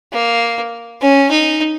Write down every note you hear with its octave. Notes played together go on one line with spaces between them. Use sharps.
A#3
C#4
D#4